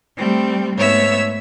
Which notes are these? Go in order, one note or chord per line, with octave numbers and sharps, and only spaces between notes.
G3 A3 C4
G#2 A3 B3 C#5 E5 E6